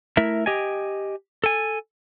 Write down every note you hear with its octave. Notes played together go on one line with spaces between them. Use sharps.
A3 E4 A#4 E5
G4 D#5 G5 G#5
A4 G#5